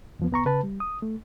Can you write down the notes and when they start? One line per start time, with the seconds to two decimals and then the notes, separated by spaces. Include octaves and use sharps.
0.19 E2 F3 B3
0.31 C2 B3 A#5 C#6
0.45 C#3 B4 A5
0.63 G3
0.80 D#6
1.02 A3